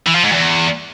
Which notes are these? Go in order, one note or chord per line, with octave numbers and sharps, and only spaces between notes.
E3
F3
G#2
E2